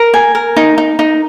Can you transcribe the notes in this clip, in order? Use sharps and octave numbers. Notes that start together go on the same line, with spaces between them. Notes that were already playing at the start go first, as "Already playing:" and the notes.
Already playing: A#4
G#5
A#4
D#4
D#4
D#4